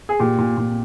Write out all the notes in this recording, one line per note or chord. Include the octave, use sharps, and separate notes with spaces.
G#4
A#2 G4
A#2
A#2